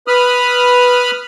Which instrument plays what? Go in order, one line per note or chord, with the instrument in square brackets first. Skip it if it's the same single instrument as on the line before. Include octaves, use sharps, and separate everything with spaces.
[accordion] B4 B5 D#6 F6